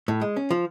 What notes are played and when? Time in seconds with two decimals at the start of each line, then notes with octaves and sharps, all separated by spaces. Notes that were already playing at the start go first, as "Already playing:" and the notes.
0.08 A2
0.21 G#3
0.36 C#4
0.51 F3